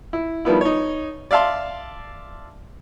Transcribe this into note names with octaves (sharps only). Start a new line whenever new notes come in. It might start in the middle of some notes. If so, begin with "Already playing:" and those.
E4
D#3 F3 G3 B3 E4
D#4 C#5
D5 E5 F5 A5 C6